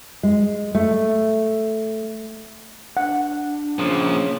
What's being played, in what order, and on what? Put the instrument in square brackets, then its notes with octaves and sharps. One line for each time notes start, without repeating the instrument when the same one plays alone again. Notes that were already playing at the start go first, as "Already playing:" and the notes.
[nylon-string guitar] G#3
A3
[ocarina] D4 [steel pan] F#5
[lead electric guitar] A#2 F3 [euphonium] C#3